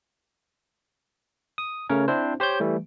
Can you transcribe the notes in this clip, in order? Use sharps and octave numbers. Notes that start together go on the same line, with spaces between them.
D#6
C#3 A3 C#4 A#4 C#5
C4 D4 E4 C5
G4 C5 C#5 G6
E3 G3 A3